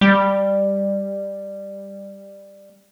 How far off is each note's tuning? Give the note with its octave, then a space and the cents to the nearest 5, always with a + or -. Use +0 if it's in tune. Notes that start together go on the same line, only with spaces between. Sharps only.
G3 +10